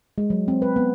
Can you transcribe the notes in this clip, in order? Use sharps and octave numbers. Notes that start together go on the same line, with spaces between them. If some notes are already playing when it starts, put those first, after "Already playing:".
G#3
F#3
C4
B4
B3